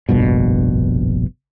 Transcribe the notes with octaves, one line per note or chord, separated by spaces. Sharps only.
F1 A#1 G2 B2